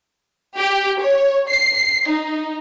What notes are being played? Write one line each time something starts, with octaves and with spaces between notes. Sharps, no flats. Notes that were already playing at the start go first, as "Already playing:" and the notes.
G4
C#5
C7
D#4